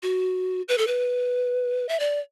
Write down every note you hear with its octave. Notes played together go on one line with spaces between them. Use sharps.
F#4
B4
A4
B4
E5
D5